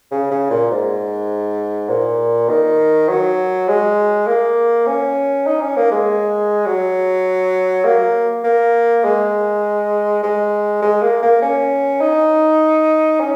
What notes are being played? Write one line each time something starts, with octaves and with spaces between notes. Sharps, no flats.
C#3
C#3
A#2
G#2
A#2
D#3
F#3
G#3
A#3
C#4
D#4
C#4
A#3
G#3
F#3
A#3
A#3
G#3
G#3
G#3
A#3
A#3
C#4
D#4
C#4